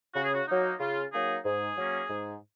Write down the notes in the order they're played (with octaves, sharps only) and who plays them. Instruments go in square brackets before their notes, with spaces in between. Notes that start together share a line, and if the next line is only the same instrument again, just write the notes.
[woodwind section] C#3 F#4
G#4
F#4
F#3 A#3 D#4
C#3 F4
F#3 A#3 D#4 G#4
G#2 G#4
F#3 A#3 C#4
G#2